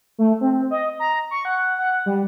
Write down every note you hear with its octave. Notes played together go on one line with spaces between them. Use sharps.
A3
C4
D#5
A#5
C#6
F#5
F#5
G3